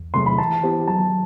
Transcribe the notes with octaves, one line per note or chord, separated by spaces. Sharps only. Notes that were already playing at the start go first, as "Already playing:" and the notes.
Already playing: E2
C3 F#3 A3 C6
B5
E3 A5
B3 E4 G4 C5
F#3 A5